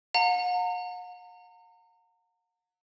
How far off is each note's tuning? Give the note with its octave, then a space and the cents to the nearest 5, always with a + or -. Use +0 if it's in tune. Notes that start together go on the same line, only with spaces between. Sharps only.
F#5 -45 A#5 -35